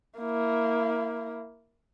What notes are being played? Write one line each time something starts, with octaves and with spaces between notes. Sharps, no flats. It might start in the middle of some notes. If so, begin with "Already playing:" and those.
A#3 E4